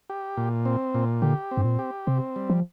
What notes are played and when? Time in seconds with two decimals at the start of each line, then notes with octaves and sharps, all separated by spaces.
0.10 G4
0.37 A#2
0.65 C4
0.94 A#2
1.22 D3 G4
1.51 C4
1.57 G2
1.65 A#2
1.79 G4
2.07 C3 C4
2.36 G3
2.50 F3